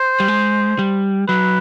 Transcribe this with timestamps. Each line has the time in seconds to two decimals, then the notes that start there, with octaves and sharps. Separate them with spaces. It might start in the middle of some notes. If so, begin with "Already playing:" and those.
Already playing: C5
0.20 G3
0.28 G#3
0.79 G3
1.28 F#3 B4